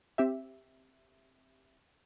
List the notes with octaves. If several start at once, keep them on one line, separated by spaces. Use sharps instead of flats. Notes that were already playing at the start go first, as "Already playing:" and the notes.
C4 G4 E5